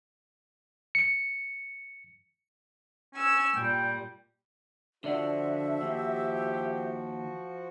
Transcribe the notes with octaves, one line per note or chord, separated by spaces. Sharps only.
C#7
C#4 G#5 E6
A#2 G3 G5
D3 F3 F#4 D5 E5 F#5
D#2 G4